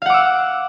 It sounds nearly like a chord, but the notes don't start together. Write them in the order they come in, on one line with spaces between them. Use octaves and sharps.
F5 F#5 D6 E6